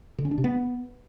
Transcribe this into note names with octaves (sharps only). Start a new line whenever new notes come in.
D3
C#4
D4
C3
B3